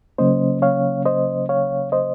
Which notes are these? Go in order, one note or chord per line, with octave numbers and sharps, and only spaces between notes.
C#3 F#3 A#3 C#4 C5 D#5
C#5 F5
C5 D#5
C#5 F5
C5 D#5